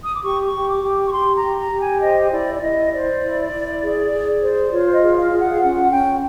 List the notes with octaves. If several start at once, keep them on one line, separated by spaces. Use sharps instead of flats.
D#6
D6
G4 C#6
D6
C#6
G4
D6
G4
C#6
G4 C6
A#5
G4
A#5
G4
G#5
C5 D#5
E4 D5
D5
E4 D#5
C5 D5
E4
E4
G#4
G#4
C5
F4 C#5
D#5
G#4
F5
F4
F#5
F5
C#4 F#5
C#4 G5